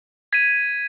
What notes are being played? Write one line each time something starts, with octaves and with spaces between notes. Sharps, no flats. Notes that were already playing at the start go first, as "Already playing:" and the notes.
G#6 B6 D#7